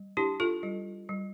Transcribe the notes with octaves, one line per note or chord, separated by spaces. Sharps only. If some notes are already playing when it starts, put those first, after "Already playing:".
Already playing: G3
D4 E4 G4
F4 A4
G3
G3